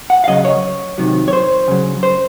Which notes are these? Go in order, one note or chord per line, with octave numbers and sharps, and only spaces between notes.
F#5
F5
C#3 F#3 D#5
C#5
C3 D#3 F#3
C#5
C5
C#3 F#3
C5